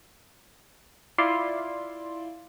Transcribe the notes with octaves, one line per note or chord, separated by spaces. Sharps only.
E4 F4 D5 C6